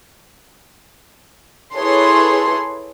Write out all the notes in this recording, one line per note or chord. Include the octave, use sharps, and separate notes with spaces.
E4 G#4 A4 B4 C#5 C6